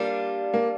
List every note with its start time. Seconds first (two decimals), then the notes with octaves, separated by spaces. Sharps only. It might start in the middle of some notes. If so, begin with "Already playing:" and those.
Already playing: G3 A#3 D4 F4
0.54 A#3